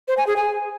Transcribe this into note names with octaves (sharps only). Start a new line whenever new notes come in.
C5
G#5
G#4
G#5